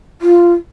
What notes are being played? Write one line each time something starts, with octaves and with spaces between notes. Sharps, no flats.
F4